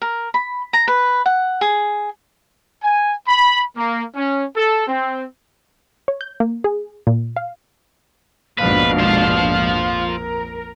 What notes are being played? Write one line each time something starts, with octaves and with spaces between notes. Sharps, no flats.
A#4
B5
A#5
B4
F#5
G#4
G#5
B5
A#3
C#4
A4
C4
C#5
G6
A#3
G#4
A#2
F5
A#1 F2 G#2 B2 D4 B4 F5
F4 C5
A#4